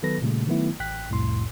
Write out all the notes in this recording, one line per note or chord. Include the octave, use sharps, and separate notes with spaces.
D#3 F#3 B3 A4 B4 A#6
A#2 C#3 G3 A3
D#3 F#3 A3 B3 E4
A1 G5 F#6 B6
C2 F2 A2 C6